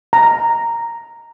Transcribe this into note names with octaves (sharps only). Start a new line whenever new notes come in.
A#5